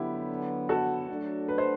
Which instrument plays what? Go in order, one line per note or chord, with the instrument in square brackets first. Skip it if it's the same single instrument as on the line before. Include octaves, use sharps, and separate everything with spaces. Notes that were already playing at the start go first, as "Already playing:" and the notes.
Already playing: [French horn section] D3 F#3 B3 [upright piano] E4 G4
[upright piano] F#4 A4
[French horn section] F#3 A3 D4
[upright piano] B4
C5